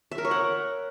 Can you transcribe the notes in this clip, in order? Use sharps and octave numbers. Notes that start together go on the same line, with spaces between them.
E5
A#4
C#5
F#5